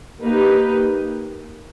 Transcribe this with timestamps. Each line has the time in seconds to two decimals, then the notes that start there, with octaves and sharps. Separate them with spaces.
0.23 A#3 D#4 G4 B4